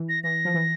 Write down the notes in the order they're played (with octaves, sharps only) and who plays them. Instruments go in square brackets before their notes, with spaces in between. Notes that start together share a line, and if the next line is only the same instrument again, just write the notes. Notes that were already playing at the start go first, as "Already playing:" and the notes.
Already playing: [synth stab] E3
[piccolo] A#6
[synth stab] E3 [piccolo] A#6
[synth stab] F3
E3